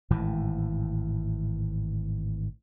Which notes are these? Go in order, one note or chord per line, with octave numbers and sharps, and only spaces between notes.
G#1 A2 E3